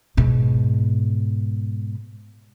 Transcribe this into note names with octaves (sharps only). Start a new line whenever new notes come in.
G#2 B2